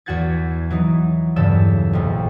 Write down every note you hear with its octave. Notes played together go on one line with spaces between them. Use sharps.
E2 E4 F#4 F#5 G#6 A6
E3 F#3 D#4
E2 G2 C#3 A4 E6
A#1 F2